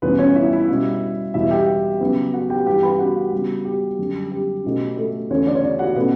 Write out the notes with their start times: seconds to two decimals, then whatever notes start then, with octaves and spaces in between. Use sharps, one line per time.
0.02 E2 B2 G3 B3 C#4 B4
0.19 C#4 C#5
0.35 E4 E5
0.53 E4 E5
0.69 B2 G3 C#4
1.34 E2 B2 G3 B3 E4 E5
1.51 G4 G5
2.01 C#3 F#3 B3
2.33 F#4 F#5
2.50 G4 G5
2.66 G2 E3 B3 G4 G5
2.83 B4 B5
2.99 F#4 F#5
3.33 C#3 G3 B3
3.65 G4
3.99 F#2 D3 G3
4.31 G4
4.64 B2 A3 C#4
4.97 A3 A4
5.30 E2 D3 A3 C#4 C#5
5.46 D4 D5
5.55 C#5
5.63 D4 D5
5.79 F#4 F#5
5.96 B2 A3 B3 C#4 B4